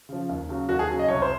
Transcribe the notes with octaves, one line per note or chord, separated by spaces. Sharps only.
C#3 F3
D#2
C#3 F#3
D#2 F#4
G#4
C#3 F#3
D#5
C2 C#5
C5